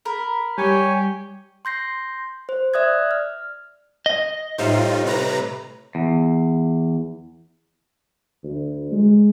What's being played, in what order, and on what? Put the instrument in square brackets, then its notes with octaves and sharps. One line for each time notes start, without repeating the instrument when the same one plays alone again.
[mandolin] A#4 [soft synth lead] B5
[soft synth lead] G3 [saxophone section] G4 [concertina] C#5 G#5
[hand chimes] C6 G6 A#6 C7
C5
D5 E5 D#6 F#6 G#6
F6
[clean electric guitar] D#5
[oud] A2 G3 C4 [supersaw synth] D#4 F4
[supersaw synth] C3 B4 A#5
[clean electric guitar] E2
[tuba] D2
G#3